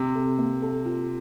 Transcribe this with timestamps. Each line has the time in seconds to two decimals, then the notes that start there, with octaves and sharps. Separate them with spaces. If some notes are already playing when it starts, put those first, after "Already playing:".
Already playing: C3
0.16 A4
0.38 A#3
0.62 A4
0.86 F4